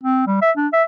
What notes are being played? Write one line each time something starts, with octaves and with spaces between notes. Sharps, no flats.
C4
G3
E5
D4
E5